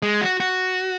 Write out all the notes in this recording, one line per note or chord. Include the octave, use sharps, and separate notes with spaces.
G#3
F#4
F#4